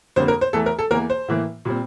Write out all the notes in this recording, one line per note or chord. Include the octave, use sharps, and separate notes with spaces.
F2 D3 G3 A#3 C5
A#4
C5
E2 E3 A3 A4
A#4
A4
E2 E3 A#3 A#4
C5
A2 E3 A#3
A#2 G3 C4